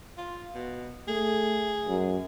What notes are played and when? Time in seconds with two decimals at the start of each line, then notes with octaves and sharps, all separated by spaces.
0.17 F4
0.55 B2
1.08 A3 G#4
1.88 F#2